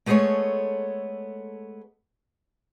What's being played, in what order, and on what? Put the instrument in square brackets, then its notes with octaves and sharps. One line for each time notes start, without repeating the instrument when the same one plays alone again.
[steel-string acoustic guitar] G#3 A3 B3 G#4 A4 C#5